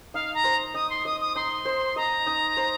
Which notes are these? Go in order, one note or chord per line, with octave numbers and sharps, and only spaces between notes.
D#4 F5
A#5
C5
D#4 D#6
C6
D#5 D#6
D#6
D#4 C6
C5
D#5 A#5
D#4
C5